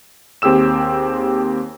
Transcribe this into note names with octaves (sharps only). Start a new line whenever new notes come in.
D#2 C4 G4 G#4 E6 E7